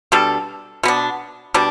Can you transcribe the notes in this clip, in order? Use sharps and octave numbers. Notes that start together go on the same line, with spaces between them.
B2 G3 D4 A4
B2 B3 D4
B2 G3 D4